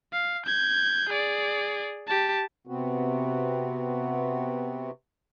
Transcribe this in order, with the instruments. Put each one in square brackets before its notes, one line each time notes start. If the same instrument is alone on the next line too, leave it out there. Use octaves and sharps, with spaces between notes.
[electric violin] F5
G6 G#6
G#4 D5
G4 A5
[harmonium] C3 B3 C4 F#4